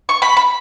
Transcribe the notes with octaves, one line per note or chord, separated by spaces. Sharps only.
C#6
B5
B5